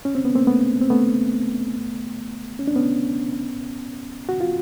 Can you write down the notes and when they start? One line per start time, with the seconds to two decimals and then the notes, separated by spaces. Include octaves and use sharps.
0.05 C#4
0.15 C4
0.25 B3
0.35 A#3 C4
0.47 A3 B3
0.81 C4
0.90 A3 B3
2.59 C#4
2.68 D4
2.76 B3 C#4
4.29 F#4
4.41 F4